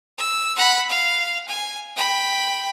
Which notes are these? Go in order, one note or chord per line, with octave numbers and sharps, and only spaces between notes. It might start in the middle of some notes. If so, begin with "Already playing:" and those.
E6
F#5 B5
F5
G#5
G5 B5